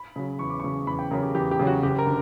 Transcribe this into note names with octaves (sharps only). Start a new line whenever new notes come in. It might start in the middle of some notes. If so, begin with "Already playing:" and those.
Already playing: B5
C#3 F#3
E2 C#6
D6
C#3 F#3 C#6
E2 B5
G5
C#3 F#3 A#4
G4
E2 G4
G4
C#3 F#3
F#4
F#1 G4
A#4
D3